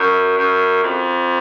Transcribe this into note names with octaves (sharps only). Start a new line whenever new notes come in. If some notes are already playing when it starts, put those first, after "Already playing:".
Already playing: F#2
F#2
F2